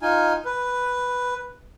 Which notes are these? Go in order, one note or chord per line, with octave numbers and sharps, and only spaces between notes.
D#4 F4 G#5
B4